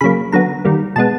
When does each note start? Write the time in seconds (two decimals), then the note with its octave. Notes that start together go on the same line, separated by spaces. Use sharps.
0.01 C#3 F#3 A#3 B5
0.32 D3 F#3 B3 A#5
0.65 D#3 G3 A#3
0.96 B2 G#3 B3 A5